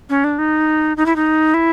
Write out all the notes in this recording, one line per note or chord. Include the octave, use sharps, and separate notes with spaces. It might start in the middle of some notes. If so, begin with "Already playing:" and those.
C#4
D4
D#4
D#4
E4
D#4
E4